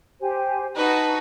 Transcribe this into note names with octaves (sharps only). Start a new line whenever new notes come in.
G4 C5 G#5
D#4 F#4 B4 A5